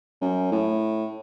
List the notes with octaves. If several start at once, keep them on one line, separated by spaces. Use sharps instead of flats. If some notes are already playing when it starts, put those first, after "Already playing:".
F#2
A2